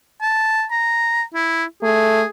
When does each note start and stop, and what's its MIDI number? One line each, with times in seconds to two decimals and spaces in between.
0.22 0.65 81
0.71 1.23 82
1.35 1.65 64
1.83 2.22 57
1.83 2.28 68